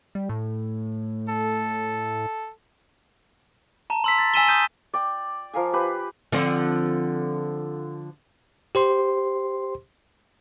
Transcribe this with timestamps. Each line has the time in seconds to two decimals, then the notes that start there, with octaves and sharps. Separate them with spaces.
0.15 G3
0.29 A2
1.29 A4
3.90 A5 A#5
4.04 C6 E6 B6
4.19 A6
4.34 G#5 E6 B6 D#7 E7 G7
4.48 D#6 G6 D#7
4.93 D5 G5
5.53 F3 A#4 F5 G#5
5.73 G4 B4
6.32 D3 F3 C4
8.75 G4 C5 C6